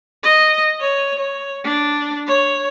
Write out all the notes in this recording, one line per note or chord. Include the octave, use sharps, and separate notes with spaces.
D#5
C#5
C#5
D4
C#5